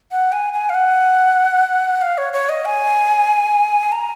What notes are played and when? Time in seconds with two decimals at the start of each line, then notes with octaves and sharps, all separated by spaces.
0.11 F#5
0.32 G#5
0.54 G#5
0.70 F5
0.74 F#5
2.02 F5
2.18 C#5
2.33 C#5
2.49 D#5
2.65 G#5
3.92 A#5